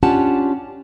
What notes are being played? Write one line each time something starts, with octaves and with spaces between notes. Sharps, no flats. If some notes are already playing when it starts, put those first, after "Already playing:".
C#4 D4 F4 G4 F#5 A5